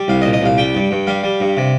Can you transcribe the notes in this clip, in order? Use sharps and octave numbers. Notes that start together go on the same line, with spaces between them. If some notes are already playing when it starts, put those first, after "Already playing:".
Already playing: G3
C2 F5
D#5
A#2
D#5
C2 F5
G3 G5
G2
G2
G3 F5
G3
G2
C3